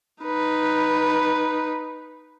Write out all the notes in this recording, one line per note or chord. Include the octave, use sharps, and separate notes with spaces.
D#4 B4